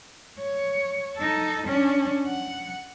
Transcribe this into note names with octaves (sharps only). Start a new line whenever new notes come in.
C#5
D#4 A4
C#4 D4
F#5